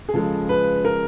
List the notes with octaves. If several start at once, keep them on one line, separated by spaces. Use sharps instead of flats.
G#4
C#3 F3 G#3 A4
B4
A#4